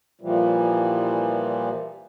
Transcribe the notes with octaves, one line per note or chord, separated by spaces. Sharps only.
A#2 E3 F3 G3